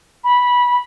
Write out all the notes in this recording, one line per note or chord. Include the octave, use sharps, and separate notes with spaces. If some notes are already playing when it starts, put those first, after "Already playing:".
B5